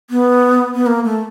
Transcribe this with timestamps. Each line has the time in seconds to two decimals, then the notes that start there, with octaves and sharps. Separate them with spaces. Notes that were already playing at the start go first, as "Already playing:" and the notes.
0.10 B3
0.74 B3
0.87 A#3
1.04 A3